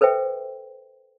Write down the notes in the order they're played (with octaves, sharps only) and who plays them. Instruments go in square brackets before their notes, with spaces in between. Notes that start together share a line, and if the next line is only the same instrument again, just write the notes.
[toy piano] A4 B4 C5 E5 G5